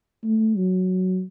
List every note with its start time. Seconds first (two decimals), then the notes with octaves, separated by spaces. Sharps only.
0.24 A3
0.57 F#3